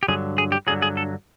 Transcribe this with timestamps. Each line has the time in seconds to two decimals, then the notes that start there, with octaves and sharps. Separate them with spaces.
0.03 G4
0.08 G2 D3 F#3 G#4
0.38 G#4
0.52 G4
0.67 G2 D3 F#3 G#4
0.82 G#4
0.97 A4